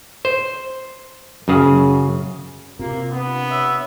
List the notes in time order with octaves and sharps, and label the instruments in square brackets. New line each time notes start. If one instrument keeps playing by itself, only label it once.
[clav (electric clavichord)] C5
F#2 C#3 G#4
[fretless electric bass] C3 [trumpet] A#3 [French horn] F4
[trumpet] B3 [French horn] D4
[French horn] C#5 [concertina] E5